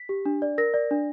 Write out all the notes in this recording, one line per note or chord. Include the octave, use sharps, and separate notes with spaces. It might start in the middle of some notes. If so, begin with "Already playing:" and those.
Already playing: B6
G4
D4
D5
A#4 A#6
D5
D4